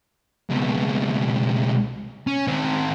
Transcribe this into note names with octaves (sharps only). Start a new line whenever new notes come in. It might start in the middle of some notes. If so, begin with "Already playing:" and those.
C#2 B2
C#4
D#3 C4